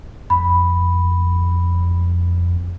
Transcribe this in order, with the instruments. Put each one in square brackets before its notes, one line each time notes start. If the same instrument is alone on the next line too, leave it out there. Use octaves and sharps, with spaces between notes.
[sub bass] F2 [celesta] B5